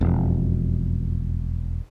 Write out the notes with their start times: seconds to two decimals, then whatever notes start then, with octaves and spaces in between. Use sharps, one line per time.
0.01 E1 F2